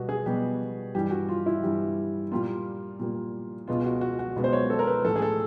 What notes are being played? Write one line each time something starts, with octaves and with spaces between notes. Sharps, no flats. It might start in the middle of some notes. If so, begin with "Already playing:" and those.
Already playing: B2 G3 B3 F#4
G#4
B2 G3 B3 G4
G2 E3 G3 G4
F#4
F4
E4
G2 E3 G3
A#2 G3 A#3 F4
A#2 G3 A#3
C#2 B2 G#3 B3 F4
F#4
F#4
F#4
C#2 B2 G#3 B3
C5
C#5
A4
A#4
B4
A2 E3 A3 A4
G#4
A4